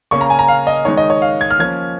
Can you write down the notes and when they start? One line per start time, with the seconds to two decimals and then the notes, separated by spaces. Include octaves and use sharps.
0.11 C#3 A#3 C#4 C#6
0.21 A#5
0.30 G#5
0.39 A#5
0.48 F5
0.67 D#5
0.85 D#3 G#3 D#4 C#5
0.97 D#5
1.10 C#5
1.22 F5
1.41 G#6
1.51 F6
1.59 F3 A#3 C#4 G#6